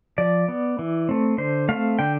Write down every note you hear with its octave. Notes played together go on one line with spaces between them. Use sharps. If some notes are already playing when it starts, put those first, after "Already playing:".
F3 D5
B3
E3
A3 C4
D3 C5
A3 C4 F5
D3 G5